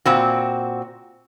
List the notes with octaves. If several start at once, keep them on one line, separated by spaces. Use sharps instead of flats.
A#2 C4 F#4